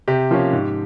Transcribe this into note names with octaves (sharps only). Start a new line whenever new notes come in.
C3 G4
F3 A#3 C#4
G#2